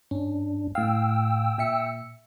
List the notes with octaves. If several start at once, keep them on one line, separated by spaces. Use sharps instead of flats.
G2 C#4 D4
A2 F5 G5 E6
A#2 E5 C#7